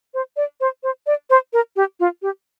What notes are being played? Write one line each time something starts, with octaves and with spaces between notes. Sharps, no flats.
C5
D5
C5
C5
D5
C5
A#4
G4
F4
G4